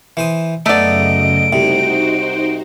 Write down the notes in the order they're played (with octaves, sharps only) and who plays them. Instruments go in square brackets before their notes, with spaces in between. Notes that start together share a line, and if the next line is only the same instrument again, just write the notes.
[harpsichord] E3 C5 D#6
[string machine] F#2 C#3 D#5 [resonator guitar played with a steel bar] A3 D5 [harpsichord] B3 D#4 [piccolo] D7
[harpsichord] C2 C3 [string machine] D#4 F#4 C5